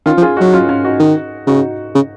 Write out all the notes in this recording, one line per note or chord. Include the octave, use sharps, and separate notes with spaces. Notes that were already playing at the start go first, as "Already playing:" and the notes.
D#3 C#4 F4
F3
F4 G#4
F#3 D#4 F#4
C#4 F4
C#4 F4
D#4 F#4
D#3
C#3 D#4 F#4
C#3